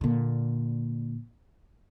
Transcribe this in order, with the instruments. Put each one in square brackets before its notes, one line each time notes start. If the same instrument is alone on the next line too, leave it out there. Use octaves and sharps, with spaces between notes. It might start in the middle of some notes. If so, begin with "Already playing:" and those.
[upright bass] A#2 D3